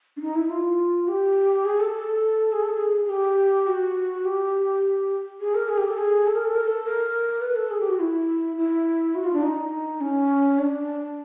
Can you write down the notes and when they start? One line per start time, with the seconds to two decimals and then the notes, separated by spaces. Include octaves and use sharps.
0.17 D4
0.21 D#4
0.35 E4
0.50 F4
1.08 G4
1.65 G#4
1.80 A4
1.93 A4
2.52 G#4
2.63 A4
2.75 G#4
3.05 G#4
3.10 G4
3.67 F#4
4.25 G4
5.40 G#4
5.55 A#4
5.69 G#4
5.78 G4
5.88 A4
5.98 G#4
6.27 A4
6.35 A#4
6.45 A4
6.54 A#4
6.64 A4
6.84 A#4
7.41 B4
7.56 A4
7.71 G#4
7.80 G4
7.89 F#4
8.00 E4
8.57 E4
9.15 F#4
9.24 F4
9.34 D4
9.43 D#4
10.01 C#4
10.59 D4